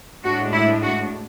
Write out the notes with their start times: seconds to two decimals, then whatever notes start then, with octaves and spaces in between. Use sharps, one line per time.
0.24 A2 G#3 D4 F#4
0.53 E4
0.82 F#4